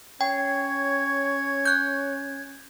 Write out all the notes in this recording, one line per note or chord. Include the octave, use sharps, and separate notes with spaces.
C#4 C#5 G5 G#6
F#6 G6